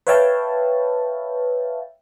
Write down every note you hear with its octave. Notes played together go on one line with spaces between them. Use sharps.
B4 C#5 E5 F5 G5 A5